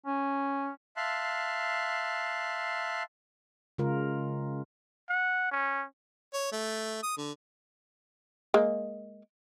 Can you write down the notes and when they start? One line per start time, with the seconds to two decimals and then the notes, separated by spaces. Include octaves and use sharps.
0.06 C#4
0.97 E5 F5 A5 C6 F#6
3.78 C#3 G#3 F4 A#4
5.09 F#5
5.52 C#4
6.34 C#5
6.52 A3
7.03 D#6
7.18 D3
8.54 G#3 A#3